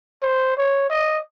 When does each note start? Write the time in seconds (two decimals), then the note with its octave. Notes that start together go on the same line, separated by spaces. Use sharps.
0.22 C5
0.57 C#5
0.90 D#5